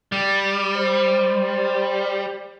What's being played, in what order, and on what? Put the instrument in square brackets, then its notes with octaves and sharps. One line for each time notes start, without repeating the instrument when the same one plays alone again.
[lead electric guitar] G3
[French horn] C5